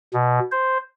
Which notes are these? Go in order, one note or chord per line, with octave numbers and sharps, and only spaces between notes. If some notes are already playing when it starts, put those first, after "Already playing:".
B2
C5